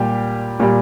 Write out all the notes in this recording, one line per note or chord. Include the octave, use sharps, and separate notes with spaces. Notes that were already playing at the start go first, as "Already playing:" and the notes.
Already playing: A#2 G3 G4
A#2 G3